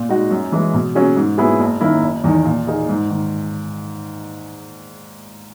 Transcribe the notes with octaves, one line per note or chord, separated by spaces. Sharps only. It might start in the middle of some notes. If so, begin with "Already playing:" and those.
Already playing: A#2
G#3 D#4 F#4
F#2
E3 G#3
B2
F#3 C#4 G#4
G#2
F#3 B3 E4 G#4
F#1
F#2 D#3 A#3 E4
F#1
E2 D#3
A#2
A#3 D#4 G#4
G#2
D#3